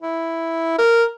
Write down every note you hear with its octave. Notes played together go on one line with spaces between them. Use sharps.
E4
A#4